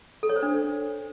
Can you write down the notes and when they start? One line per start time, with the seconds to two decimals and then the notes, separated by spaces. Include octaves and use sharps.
0.23 A4
0.29 C#5
0.36 C5
0.43 D4